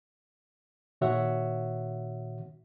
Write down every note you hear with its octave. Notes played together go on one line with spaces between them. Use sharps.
A#2 D#3 F#4 C#5 E5 F#5